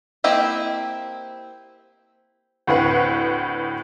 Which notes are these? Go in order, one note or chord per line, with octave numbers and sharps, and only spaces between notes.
A#3 C4 E4 G4 D#5
D2 A2 C4 B4 F#5